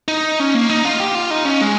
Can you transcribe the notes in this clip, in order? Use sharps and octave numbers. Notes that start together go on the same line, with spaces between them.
D#4
C#4
A#3
D#4
F4
G4
F4
D#4
C#4
G#3